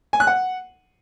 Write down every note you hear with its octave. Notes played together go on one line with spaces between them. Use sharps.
G#5
F#6
F#5